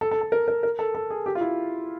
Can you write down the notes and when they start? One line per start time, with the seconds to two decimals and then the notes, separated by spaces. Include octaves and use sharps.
0.01 A4
0.11 A4
0.21 A4
0.32 A#4
0.48 A#4
0.63 A#4
0.79 A4
0.95 A4
1.10 G#4
1.26 G4
1.35 F4
1.41 E4